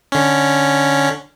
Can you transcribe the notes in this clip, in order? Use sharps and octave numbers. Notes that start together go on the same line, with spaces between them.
D3 C#4